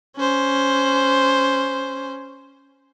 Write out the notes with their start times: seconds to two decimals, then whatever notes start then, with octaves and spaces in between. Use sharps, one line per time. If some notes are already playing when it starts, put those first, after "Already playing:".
0.17 C#4 C5